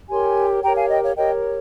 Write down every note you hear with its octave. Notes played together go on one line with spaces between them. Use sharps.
G4 A#4 C#5 G#5 C6
G4 A#4 C#5 G5 A#5
F5 G#5
D#5 G5
C#5 F5
G4 A#4 C#5 D#5 G5